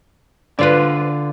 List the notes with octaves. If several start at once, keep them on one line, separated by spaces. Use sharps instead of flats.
D3 F4 B4 C#5 D5